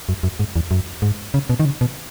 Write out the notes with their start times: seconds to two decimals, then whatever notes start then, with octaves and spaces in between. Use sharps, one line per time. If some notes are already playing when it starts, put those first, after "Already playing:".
0.09 F#2
0.23 F#2
0.40 G#2
0.56 E2
0.71 F#2
1.02 G#2
1.34 C#3
1.50 B2
1.60 D#3
1.65 C#3
1.81 B2